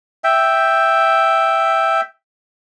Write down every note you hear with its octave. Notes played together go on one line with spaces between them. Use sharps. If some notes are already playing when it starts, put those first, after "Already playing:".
E5 G5